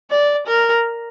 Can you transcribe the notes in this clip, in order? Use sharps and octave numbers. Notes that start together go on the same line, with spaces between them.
D5
A#4